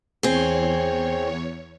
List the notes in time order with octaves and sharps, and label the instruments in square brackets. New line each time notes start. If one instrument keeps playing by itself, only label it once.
[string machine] E2 C#5 [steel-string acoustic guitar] C4 G#4